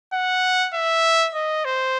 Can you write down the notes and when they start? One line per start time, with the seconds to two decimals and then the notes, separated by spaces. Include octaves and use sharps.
0.14 F#5
0.74 E5
1.35 D#5
1.65 C5